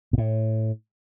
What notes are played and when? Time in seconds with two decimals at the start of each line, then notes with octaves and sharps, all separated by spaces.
0.13 B2
0.18 A2